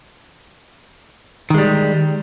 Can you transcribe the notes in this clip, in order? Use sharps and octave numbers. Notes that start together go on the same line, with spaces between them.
D#3 G3 G#3